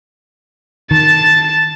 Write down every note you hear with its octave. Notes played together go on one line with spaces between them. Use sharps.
D#3 A5 A6